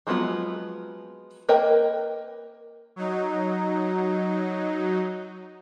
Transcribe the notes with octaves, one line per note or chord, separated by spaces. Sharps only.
F3 F#3 G#3 B3 F4
A#3 A#4 B4 D#5 G5
F#3 D#4